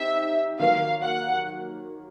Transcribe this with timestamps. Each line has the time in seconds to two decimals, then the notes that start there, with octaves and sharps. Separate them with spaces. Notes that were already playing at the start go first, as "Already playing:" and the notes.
Already playing: C4 D#4 G4 E5
0.60 D#3 F#3 A#3 F5
1.03 F#5